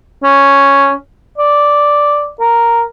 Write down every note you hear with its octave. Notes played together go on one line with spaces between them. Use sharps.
C#4
D5
A#4